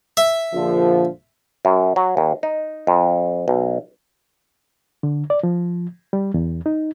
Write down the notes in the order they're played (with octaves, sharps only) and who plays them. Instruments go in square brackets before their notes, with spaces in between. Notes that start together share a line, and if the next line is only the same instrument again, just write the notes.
[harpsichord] E5
[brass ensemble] A#1 D3 F3
[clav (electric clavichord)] F#2
F#3
D#2
D#4
F2
B1
[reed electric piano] D3
D5
F3
G3
E2
D#4